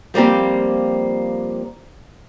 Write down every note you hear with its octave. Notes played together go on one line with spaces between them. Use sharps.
F3 G3 A#3 C4 G4